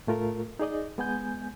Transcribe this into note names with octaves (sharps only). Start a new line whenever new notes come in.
A2 A3 F4 A#4
D#4 G#4 D5 D#5
G#3 B3 G#5 G6